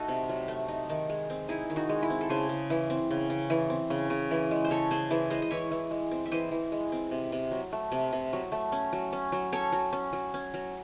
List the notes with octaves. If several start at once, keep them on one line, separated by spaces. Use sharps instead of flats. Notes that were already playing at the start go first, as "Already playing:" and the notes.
Already playing: A3 D#4 F#4 A4
C3
F#3
A3
D#4
D#3
G#3
C4
D#4 E4 G#4
D#3
D#4 F#4
G#3
E4
C4
A4
C#3 G#4 C5
C#3
E3
C4
C#3
C#3
E3
C4
C#3
C#3
E3
G#3
C5
C#3 A4 C#5
C#3 G#4 C5
E3 G#4 C5
G#3 C5 D#5
D#5
E3 C#5 E5
E3
G#3
C4
E5
E3 C5 D#5
E3
G#3
C4
C3
C3
F#3
A3
C3
C3
F#3
A3
C#4
F#3
C#4
F#3
C#4 A4 C#5
F#3
C#4
F#3
C#4
F#3